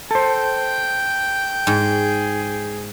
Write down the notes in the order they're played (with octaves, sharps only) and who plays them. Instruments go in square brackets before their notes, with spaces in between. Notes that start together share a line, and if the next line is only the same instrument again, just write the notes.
[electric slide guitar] A4 C5 [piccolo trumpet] G5
[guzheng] G#2 [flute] G#4